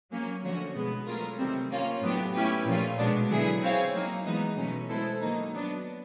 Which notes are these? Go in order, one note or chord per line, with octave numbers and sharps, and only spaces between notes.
F#3 A#3 C#4
D3 F3 A3 C#4 F#4
B2 G#3 B3
F#3 A3 C#4 F4 A#4
C3 D#3 G3 C4
A#3 C#4 F4
A2 F#3 B3 D4 G4
A3 C#4 E4 G4 B4
A#2 F3 A3 C#4 F4
B2 G#3 B3 D4
D3 F#3 B3 E4 G#4
C4 E4 G#4 C#5 F5
F#3 A#3 D#4
E3 G#3 B3 D#4
B2 F#3 A3 C#4
G#3 B3 E4 A4 C5
D#3 F#3 A#3 D#4
F#3 B3 D4